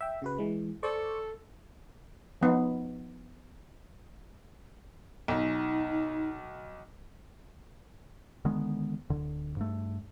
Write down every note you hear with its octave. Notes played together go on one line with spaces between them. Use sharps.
E5 G5
C#3 F#4 B4
E3 G#3
A4 C5 D5 C#6
F3 B3 D#4
B1 D#4
D3 D#3 G#3 B3
D1 D3
G2 A3